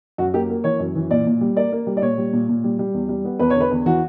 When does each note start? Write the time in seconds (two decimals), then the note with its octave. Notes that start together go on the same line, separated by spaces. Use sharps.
0.18 F#2 F#4
0.34 A#3 G4
0.50 A#3
0.64 E3 C#5
0.79 F#2
0.95 E3
1.11 A#2 D5
1.26 A#2
1.41 G3
1.56 A#3 D5
1.72 A#3
1.87 G3
1.97 D5
2.02 A#2 C#5
2.18 G3
2.33 A#2
2.49 A#2
2.64 G3
2.79 G3
2.94 E2
3.09 G3
3.25 B3
3.39 E2 B4
3.50 C#5
3.55 D3
3.61 B4
3.71 E2
3.86 E3 F#4